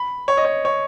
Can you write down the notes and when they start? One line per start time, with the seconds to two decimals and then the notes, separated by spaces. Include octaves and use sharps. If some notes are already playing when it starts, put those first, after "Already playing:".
Already playing: B5
0.28 C#5
0.37 D#5
0.45 C#5
0.65 C#5